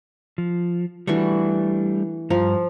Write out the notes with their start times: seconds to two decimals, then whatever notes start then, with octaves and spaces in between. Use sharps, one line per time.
0.38 F3
1.07 E3 G3 A3 D4 F#4 C#6
2.30 G2 F3 A#5